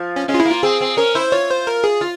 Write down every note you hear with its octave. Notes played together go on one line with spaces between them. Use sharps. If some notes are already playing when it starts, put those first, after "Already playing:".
Already playing: F3
C#4
G#3 C#4
F4
E4
A#3
F4
C4 G#4
C4
C#4 A#4
E4 C5
F4 C#5
C5
A#4
G#4
F4